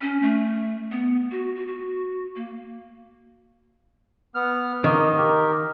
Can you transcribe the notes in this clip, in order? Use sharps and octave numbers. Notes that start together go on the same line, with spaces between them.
C#4
A3
B3
F#4
F#4
F#4
A#3
B3 F6
D#3 A#3
G4 A#4